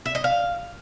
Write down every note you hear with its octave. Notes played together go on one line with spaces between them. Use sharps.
E5
D#5
F5